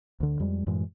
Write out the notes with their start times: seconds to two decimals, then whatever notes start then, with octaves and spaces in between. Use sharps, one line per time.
0.20 D2 D3
0.40 F2 G3 G#3
0.67 F#2 A2 E3 G#3